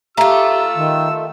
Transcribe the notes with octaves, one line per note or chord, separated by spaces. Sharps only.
A3 F4 G4 E5 A#5 E6
D#3